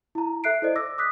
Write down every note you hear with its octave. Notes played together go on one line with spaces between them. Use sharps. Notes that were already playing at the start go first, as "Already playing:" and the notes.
E4 A#5
A4 E5 F#6 C7 D7
E4 A4 C5 D5 D#5
D6 E6 A#6
D6 D#6 F#6 B6